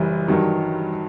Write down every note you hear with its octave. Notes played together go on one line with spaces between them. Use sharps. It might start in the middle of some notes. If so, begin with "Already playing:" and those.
Already playing: F#1 F#2 E3 F#3 G3
G2 D#3 F#3